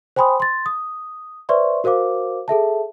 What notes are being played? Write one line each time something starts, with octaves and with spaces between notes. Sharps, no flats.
C5 G5 G#5 B5 C6 D#6
C6 A6
D#6
B4 C5 D5 E5 C6 C#6
F#4 A#4 C5 F5 D6
G#4 A4 E5 A5